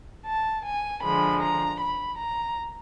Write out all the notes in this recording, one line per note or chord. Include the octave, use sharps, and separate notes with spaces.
A5
G#5
D3 F3 G#3 B5
A#5
B5
A#5